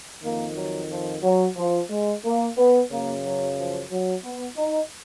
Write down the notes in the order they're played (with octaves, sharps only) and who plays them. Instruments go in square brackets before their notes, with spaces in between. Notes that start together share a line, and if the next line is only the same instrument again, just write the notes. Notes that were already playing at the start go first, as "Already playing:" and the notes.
[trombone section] F2 D#3 A#3
F#3
F3
F#3
F3
G#3
A#3
B3
F#2 C#3 A#3
F#3
F3
F#3
B3
D#4